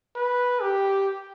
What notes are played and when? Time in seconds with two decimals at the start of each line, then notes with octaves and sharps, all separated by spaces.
0.16 B4
0.61 G4